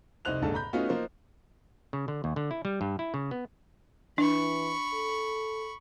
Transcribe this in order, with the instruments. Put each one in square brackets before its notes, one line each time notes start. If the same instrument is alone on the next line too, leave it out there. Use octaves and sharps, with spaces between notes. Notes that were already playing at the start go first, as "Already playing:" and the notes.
[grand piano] F1 C2 D#4 C5 F#6 F7
F1 A#1 G#2 D3 A4 A5
A#5 B5 G6
A3 B3 C#4 D#4 F4 F#4
F3 A#3 D#4 C5
[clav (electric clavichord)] C#3
D3
D#2
D3
E4
G3
G2
E4
C#3
B3
[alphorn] E3 [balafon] D4 [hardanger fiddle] B5 C#6
[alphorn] A4